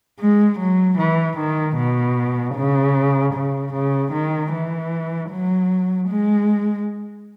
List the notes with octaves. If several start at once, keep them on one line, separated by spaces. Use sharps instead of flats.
G#3
F#3
E3
D#3
B2
C#3
C#3
C#3
D#3
E3
F#3
G#3